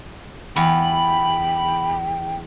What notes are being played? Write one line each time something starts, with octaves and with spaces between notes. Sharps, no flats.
E2 G5 B5